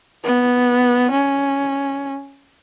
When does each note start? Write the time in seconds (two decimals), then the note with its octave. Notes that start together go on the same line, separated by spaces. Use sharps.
0.24 B3
1.12 C#4